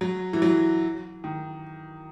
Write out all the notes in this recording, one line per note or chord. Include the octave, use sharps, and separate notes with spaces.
F#3
E3
F#3
D#3